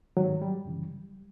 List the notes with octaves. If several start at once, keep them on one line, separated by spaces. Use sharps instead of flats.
G#2 D#3 F#3
G3
F#2 C#3 E3